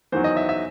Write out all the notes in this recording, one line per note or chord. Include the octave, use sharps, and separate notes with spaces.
E2 D#3 F#3 C5
D#5
E5
E5